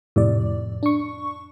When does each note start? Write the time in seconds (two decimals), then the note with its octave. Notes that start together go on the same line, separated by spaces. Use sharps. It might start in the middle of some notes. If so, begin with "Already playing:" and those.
0.16 F2 A2 C3 D5
0.83 D4 C#6